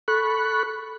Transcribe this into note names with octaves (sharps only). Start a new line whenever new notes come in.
A4 B5 C#6 F#6